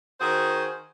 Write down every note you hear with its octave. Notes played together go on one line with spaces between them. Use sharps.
D#3 F#4 G#4 A#4 C5